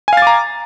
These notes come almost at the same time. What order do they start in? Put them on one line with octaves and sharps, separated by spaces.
G#5 F5 A6 D6 A#5